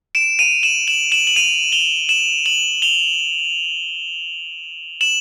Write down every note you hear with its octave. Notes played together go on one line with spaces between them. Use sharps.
D7 E7
D#7 F7
E7 F#7
E7 F#7
E7 F#7
F#7
D#7 F7
F7 G7
E7 F#7
E7 F#7
F7 G7
E7 F#7